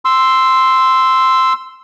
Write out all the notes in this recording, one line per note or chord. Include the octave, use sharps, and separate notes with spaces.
C6 E6